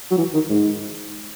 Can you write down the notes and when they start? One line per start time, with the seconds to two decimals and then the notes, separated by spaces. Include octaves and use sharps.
0.11 F#3
0.18 E3
0.34 D#3
0.49 G#2